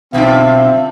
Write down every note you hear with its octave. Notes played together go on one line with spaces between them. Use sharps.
B1 G2 C#3 C4 F4 E5 G5